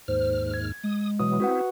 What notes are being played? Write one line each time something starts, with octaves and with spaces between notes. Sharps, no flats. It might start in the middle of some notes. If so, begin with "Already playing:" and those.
D#2 G#2 C5 F6
G#6
G#3 D#6
B2 E3 F#3 D#6
C4 E4 F#4 B4 F#5